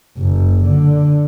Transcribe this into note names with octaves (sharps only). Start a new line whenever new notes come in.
F#1
D3